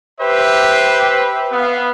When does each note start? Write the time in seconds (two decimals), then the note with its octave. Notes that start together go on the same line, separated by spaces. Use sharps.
0.21 G4 B4 C5 E5
1.52 B3 F5